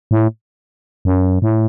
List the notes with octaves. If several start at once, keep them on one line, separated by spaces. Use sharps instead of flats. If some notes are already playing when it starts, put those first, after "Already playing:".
A2
F#2
A2